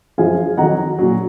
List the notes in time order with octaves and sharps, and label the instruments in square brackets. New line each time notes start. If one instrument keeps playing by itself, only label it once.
[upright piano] F#2 F3 G#3 F5 G#5
F2 D#3 F#3 F#5 A#5
A#2 F#3